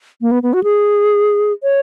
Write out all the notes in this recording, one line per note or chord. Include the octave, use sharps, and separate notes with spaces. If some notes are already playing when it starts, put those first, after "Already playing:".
A#3
B3
B3
F#4
G#4
C#5